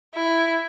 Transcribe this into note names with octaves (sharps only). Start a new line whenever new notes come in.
E4